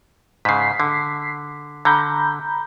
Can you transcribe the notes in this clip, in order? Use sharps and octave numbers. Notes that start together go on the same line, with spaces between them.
G#2 C#3 B6 C7
D3
D3 A#5 B5 G6